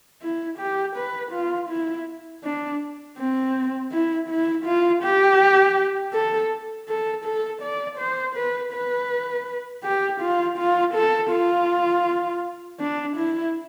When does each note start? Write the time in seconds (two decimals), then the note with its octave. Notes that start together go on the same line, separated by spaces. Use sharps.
0.22 E4
0.59 G4
0.96 B4
1.32 F4
1.70 E4
2.44 D4
3.18 C4
3.92 E4
4.29 E4
4.65 F4
5.03 G4
6.13 A4
6.88 A4
7.25 A4
7.62 D5
7.99 C5
8.36 B4
8.73 B4
9.84 G4
10.21 F4
10.58 F4
10.95 A4
11.31 F4
12.80 D4
13.17 E4